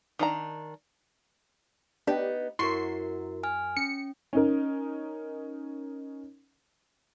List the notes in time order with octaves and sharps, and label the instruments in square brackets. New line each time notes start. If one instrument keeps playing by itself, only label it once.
[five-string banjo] D#3 D4 A#5
[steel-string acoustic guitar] B3 D#4 [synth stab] D4 G4
[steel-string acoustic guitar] F#2 [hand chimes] E4 F#4 A#4 [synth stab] C6 C#6 C7
[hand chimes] G#5 F6
[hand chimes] C#4 [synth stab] C#7
[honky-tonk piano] C#4 D#4 A#4